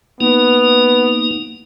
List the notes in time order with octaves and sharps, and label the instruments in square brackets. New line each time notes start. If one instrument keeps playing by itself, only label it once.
[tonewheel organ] A#3 D#4 [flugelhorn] B3